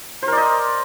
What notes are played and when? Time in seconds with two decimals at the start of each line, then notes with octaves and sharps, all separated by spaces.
0.23 C5
0.27 A#4
0.32 D5
0.37 D#5